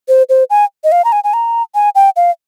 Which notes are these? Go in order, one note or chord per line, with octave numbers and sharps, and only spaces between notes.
C5
C5
G#5
D#5
F5
A#5
G#5
G#5
A#5
G#5
G5
F5